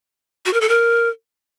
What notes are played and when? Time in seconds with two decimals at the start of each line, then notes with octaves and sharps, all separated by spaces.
0.46 F#4
0.53 A#4
0.61 A4
0.69 A#4